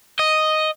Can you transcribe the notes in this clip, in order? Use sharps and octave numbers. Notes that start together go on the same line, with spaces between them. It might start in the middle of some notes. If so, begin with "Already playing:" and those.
D#5